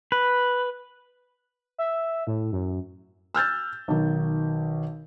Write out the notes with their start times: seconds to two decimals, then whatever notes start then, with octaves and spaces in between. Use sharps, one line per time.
0.12 B4
1.78 E5
2.27 A2
2.52 F#2
3.34 E6 F6 G6 A6
3.88 B1 D#3